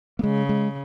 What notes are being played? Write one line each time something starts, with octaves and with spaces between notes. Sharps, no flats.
A#3
C#3 G#3
G#3